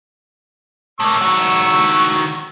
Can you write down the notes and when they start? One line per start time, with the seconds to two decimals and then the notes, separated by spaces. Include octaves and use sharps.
1.00 A2 A#3 C#6 E6
1.21 D#3 F#4